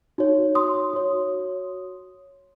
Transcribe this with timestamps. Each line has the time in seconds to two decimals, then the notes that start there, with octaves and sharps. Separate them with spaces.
0.18 D#4 F#4 C#5
0.55 C6 D#6
0.93 F#4 C#5